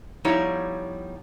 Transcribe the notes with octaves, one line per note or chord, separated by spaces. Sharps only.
F3 G3 B3 D#4 E4 C#5